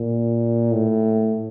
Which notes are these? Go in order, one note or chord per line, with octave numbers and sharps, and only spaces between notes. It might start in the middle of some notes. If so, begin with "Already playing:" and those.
Already playing: A#2
A2